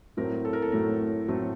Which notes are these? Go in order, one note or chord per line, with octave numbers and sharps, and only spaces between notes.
A2 F#3 A3 C4 A#4
A4
A#4
A4
A2 F#3 A3 C4 A#4
A2 F#3 A3 C4